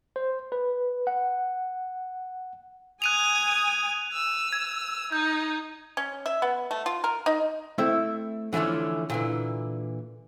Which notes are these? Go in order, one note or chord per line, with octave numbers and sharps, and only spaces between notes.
C5
B4
F#5
G#5 D#6 F#6 G#6 D#7 F7
E6
G#6
D#4 G6
C#4
E5
B3
A3
F4
A#4
D#4
A3 C4 E4 E5
D3 E3 F3 A3 C#4
A#2 D3 E3